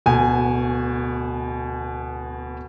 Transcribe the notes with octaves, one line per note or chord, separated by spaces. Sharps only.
D1 B2 G#5